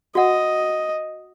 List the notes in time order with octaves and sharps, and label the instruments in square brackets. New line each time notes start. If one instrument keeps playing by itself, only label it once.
[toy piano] F#4 F#5 [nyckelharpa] D#5